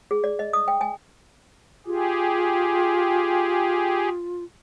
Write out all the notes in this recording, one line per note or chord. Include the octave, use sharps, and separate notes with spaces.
G#4
D5
D#5
D#6
G5
G#5
F4 G4 G#4